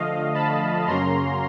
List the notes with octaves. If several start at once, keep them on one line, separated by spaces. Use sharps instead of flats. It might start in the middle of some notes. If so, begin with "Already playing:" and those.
Already playing: D3 F3 A3 D#5 F5
A5 B5
F#2 C#3 F#3 A#3 C#4 A#5 C6